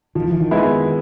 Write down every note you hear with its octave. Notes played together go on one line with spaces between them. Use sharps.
D#3 F3
E3
D#3
G#3 B3 E4